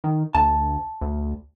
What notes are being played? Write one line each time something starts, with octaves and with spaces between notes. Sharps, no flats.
D#3
D2 A5
D2